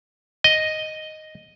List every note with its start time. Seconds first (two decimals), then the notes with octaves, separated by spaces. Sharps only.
0.44 D#5